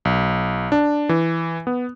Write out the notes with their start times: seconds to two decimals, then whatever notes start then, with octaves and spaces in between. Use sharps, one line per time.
0.05 B1
0.72 D4
1.09 E3
1.67 B3